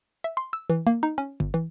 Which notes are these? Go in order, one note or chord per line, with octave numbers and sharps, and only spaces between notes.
E5
C6
E6
E3
A#3
D#4
C#4
G1
E3